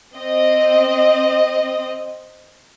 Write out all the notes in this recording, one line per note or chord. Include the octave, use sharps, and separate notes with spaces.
C4 D#5